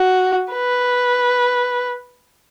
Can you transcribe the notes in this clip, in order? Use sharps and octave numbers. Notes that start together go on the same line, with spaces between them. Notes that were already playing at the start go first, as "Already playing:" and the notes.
Already playing: F#4
B4